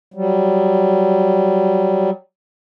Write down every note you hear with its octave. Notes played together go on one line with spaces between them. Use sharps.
F#3 G3